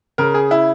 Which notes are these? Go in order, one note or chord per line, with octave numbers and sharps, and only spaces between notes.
C#3 A#4
G#4
E4